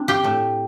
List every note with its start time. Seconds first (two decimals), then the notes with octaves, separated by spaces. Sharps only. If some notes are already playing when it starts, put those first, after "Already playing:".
Already playing: C4 D4
0.08 G4 G5
0.24 A2 A3